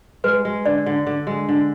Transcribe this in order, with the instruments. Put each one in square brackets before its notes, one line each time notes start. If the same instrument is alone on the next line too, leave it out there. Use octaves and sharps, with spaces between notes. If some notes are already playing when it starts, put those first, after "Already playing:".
[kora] G#3 [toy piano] B4
[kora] G#3
[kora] D3 [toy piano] D5
[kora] D3
D3
G#3
D3